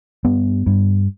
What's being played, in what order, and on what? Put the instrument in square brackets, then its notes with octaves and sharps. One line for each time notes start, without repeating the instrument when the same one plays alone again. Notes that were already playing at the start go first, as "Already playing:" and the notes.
[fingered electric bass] G2 B3
G2